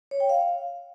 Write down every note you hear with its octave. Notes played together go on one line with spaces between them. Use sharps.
C#5
G5
F5